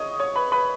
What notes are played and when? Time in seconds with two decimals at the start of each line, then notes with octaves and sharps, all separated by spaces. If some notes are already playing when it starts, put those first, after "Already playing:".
Already playing: C#5 D#5 D#6
0.19 C#5 C#6
0.36 B4 B5
0.52 B4 B5